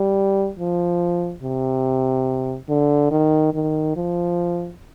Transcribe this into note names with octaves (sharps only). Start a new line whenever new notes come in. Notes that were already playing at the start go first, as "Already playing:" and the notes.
Already playing: G3
F3
C3
D3
D#3
D#3
F3